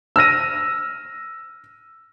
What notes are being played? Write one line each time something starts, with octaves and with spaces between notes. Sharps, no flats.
E6 F6 A#6 D#7